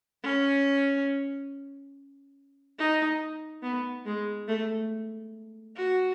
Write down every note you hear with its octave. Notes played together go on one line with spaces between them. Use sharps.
C#4
D#4
B3
G#3
A3
F#4